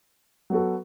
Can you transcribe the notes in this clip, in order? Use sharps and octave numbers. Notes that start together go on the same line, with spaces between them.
F#3 B3 F#4 A4